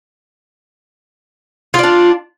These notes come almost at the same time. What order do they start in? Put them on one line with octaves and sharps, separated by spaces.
F4 D5 D4